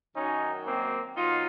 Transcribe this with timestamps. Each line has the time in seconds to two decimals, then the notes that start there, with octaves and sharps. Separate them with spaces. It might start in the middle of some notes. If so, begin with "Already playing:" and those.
0.15 F#2 D#3 F#3 C#4 D#4
0.66 A#3 C4
1.15 B2 F#3 D#4 F4